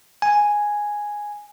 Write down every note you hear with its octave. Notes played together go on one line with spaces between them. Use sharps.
G#5